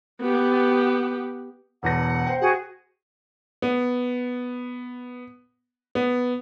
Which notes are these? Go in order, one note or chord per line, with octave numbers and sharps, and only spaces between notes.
B3 G4
E1 E2 F#5 A#6
C5 G5
F#4 G#4 F#5
B3
B3